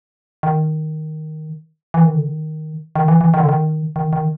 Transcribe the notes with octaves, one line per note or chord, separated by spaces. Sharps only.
D#3
E3
D#3
D3
D#3
D#3
E3
E3
D#3
D3
D#3
D#3
D#3